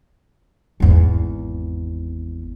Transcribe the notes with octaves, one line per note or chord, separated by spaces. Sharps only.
G#1 E2